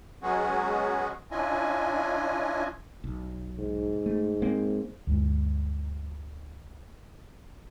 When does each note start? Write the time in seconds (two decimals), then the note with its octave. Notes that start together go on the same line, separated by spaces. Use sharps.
0.22 F#3 G#3 B3 C#4 F#4 G#4
1.31 C#4 D4 E4 F4 D#5 G#5
3.04 B1
3.58 G#2
4.06 A3
4.42 G#3 A#3 C4
5.07 D2 G2 G#3